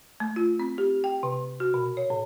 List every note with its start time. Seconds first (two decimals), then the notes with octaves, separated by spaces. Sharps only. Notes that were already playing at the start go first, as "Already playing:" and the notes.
0.20 A3
0.36 F4
0.60 C4
0.78 G4
1.04 G5
1.23 C3
1.60 F#4
1.74 B2
1.97 C#5
2.10 A2